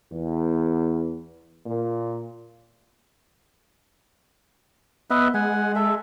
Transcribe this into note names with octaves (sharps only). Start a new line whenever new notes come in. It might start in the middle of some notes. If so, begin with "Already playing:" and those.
E2
A#2
B3 B4 D#5 E5
G#3 F#5 G#5
A4 E5